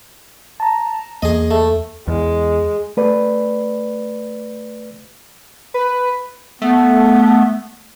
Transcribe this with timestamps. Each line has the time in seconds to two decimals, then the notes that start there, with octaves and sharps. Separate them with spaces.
0.60 A5 A#5
1.22 E2 A#3 G#4 D#5
1.51 A3
2.08 E2 G#3
2.97 A3 B4 D5
5.74 B4
6.62 A3 B3